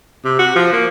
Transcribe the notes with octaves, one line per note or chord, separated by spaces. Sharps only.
C3
F#4
F3
A#3